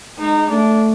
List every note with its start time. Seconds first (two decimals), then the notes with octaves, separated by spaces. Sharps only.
0.19 G#3 D#4
0.49 A3 D4